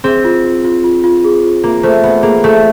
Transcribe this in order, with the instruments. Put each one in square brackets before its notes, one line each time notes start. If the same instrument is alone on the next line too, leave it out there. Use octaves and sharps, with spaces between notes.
[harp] C4 [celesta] G#4
[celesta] F4
F4
F4
F4
F4
G#4
F4
[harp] A#3 [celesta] F4
[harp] A3 [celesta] C5
[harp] B3 [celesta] C5
[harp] A#3 [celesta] G#4
[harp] A3 [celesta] G#4